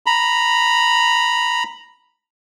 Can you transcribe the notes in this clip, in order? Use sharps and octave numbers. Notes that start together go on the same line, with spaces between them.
A#5 B5